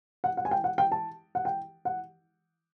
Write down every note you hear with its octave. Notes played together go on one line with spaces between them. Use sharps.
F#5
F#5
G#5
G5
F#5
G5
A5
F#5
G5
F#5